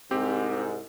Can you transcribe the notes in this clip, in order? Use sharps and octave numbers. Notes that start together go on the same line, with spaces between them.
C2 G#2 C4 G4